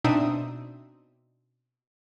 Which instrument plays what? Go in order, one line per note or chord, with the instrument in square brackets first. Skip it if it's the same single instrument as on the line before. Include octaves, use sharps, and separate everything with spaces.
[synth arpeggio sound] B2 C4 D4 D#4 E5 D#6